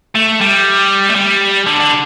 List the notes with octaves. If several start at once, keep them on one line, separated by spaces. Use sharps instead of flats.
A3
G3
A3
G3
D3
D3